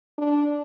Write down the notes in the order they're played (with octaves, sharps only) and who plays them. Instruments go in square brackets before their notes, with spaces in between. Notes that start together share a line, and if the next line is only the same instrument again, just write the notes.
[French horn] D4